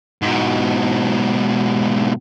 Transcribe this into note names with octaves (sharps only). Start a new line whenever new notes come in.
G#2 B2